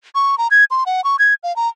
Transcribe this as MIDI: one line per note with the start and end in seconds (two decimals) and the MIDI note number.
0.15 0.38 85
0.38 0.48 82
0.51 0.64 92
0.71 0.84 84
0.86 1.04 78
1.04 1.16 85
1.19 1.34 92
1.43 1.55 77
1.56 1.68 82